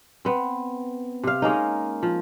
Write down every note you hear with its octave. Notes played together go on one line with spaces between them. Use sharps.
B3 C4
C3 F5
G#3 A#3 C#4 D#4
F3